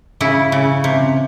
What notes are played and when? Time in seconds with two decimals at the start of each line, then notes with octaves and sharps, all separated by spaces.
0.21 C#3 E4
0.52 C#3
0.84 C3